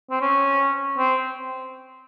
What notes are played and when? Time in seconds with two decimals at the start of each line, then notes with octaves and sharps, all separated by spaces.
0.10 C4
0.21 C#4
0.98 C4